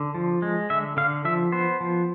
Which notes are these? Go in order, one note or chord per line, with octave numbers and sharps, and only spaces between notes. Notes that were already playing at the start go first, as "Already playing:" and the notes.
Already playing: D3
F3
G#3
D3 E5
D3 F5
F3 E5
B3 C5
F3